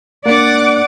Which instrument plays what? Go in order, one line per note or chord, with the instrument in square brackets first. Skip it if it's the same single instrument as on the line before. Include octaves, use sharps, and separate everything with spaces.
[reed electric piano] A#3 D4 [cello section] D5 [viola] F#5 D6